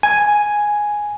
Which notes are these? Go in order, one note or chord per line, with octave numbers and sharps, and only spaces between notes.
G#5